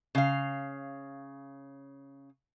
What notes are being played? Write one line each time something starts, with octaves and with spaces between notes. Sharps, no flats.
C#3 F5